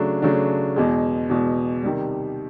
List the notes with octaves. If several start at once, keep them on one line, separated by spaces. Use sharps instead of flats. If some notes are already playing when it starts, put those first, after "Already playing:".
Already playing: C#3 F#3 A3 D4
C#3 F#3 A3 D4
E2 B2 G#3
E2 B2 G#3
C3 D#3 G3